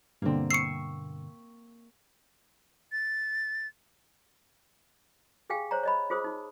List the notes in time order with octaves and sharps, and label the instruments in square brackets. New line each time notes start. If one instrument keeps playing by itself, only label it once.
[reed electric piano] G2 B2 D3 [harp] A#3 C4
[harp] C#6 E6 [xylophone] C7 C#7
[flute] A6
[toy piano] G4 G#4 F5 G5 G#5
C5 C#5 A#5
C#5 D#5 B5
F4 G#4 C5 D#6
D#4